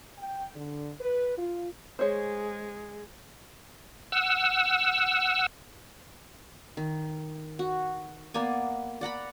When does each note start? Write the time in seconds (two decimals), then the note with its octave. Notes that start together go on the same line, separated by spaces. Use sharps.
0.18 G5
0.55 D3
1.00 B4
1.37 F4
1.99 G#3 G#4 C5 C#5
4.12 F#5 E6
6.77 D#3
7.59 F#4
8.34 A#3 B3 D5 G#5
9.01 D5 F#5 A#5 B5